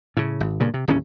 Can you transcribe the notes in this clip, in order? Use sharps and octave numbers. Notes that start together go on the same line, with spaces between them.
A2 C#3
G#1
G2 A#2 C#3
C3
D1 D#2 A2 C#4